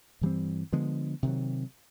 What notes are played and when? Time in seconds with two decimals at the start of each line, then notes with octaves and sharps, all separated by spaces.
0.21 G2 E3 G3 C4
0.73 D3 F3 G#3 B3
1.23 C3 D#3 F#3